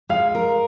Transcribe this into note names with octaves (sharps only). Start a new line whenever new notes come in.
G#3 F5
A#4